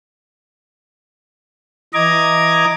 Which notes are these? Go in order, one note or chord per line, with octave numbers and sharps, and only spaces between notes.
E3 D#5 A#5 D6 G#6